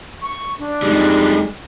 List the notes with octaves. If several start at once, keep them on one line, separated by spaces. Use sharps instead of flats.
C#6
D4
F2 G3 G#3 D#4